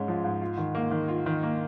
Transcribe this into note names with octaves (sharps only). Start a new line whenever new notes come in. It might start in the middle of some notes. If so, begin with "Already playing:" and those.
Already playing: G#2 G#3 C#4
F3
G#2
F4
D#3
A#3
D#3
F4
D#3
A#3